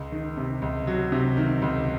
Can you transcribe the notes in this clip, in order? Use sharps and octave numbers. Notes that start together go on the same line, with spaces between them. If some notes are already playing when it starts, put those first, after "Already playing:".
Already playing: C#2
D#3
C3
C#2
F#3
C3
D#3
C#2